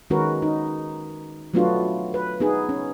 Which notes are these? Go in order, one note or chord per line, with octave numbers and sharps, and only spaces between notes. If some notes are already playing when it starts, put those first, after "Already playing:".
D#3 G#3 C#4 F#4 A#4 B4
D#4
F#3 A3 B3 D4 F4 F#4
B4
B3 D#4 G#4
C#4